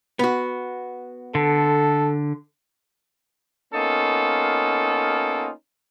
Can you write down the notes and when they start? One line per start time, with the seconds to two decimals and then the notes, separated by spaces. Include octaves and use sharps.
0.19 B3 F#4
1.35 D3 A4
3.74 A#3 B3 C#4 D#4 F4 A4